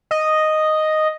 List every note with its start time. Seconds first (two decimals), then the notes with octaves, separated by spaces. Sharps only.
0.11 D#5